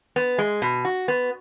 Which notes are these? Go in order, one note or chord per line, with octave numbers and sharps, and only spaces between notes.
B3
G#3
B2
F#4
B3